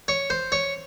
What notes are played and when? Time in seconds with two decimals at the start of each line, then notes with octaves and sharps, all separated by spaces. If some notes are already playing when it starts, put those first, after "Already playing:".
0.08 C#5
0.30 C5
0.52 C#5